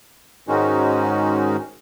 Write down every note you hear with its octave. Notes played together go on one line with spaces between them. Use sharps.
G#2 D#3 G#3 C#4 D#4 F#4